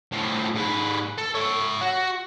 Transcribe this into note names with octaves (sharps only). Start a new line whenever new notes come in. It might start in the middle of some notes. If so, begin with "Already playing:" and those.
A2 F3
G#2 B4
A4
C#5 E5
F#4